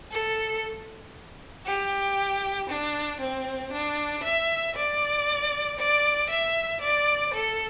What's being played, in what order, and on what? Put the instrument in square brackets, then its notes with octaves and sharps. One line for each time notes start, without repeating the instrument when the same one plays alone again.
[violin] A4
G4
D4
C4
D4
E5
D5
D5
E5
D5
A4